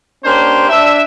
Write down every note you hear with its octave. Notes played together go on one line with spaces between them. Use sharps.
A#3 C#4 D4 G4 C5
D4 E5